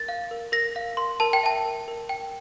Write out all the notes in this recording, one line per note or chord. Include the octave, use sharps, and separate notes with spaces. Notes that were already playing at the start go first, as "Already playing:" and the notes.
Already playing: A#4 A6
F5
A#4
A#4 A#6
F5
A#4 C6
A#4 A5
G5
E5 A5
A#4
A#4
G5